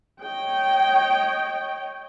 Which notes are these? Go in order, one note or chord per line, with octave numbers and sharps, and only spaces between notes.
C#5 D#5 G5